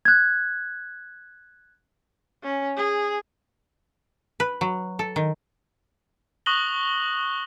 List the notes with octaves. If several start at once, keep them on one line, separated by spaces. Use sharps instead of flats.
F#6 G#6
C#4
G#4
B4
F#3
A4
D#3
C#6 D#6 F#6 A#6 F#7 G7